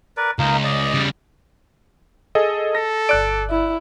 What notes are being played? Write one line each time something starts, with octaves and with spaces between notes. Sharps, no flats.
A#4 B4 D5
C#2 A#3 D#4 A#4
D5 D#5
C#3 G3
G#4 A4 D#5
A4 A#6
G1 D5 F#6 D7
E4